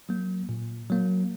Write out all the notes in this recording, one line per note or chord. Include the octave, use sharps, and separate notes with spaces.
F#3 A#3
A#2
F#3 A#3